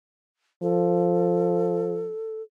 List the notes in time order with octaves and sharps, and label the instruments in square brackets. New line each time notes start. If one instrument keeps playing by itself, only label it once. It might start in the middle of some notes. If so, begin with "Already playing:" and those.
[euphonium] F3 [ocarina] A4